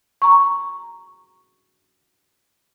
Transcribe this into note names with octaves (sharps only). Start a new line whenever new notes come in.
A#5 C#6